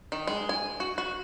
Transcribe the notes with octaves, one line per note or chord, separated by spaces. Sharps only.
D#3
G#3
G#5
F#4
F#4